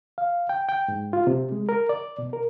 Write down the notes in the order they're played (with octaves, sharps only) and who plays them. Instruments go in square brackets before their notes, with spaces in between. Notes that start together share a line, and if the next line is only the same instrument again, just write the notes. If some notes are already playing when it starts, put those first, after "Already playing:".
[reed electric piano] F5
G5
G5
G#2
F4
C3
G#3
A#4
D5
B2
A#4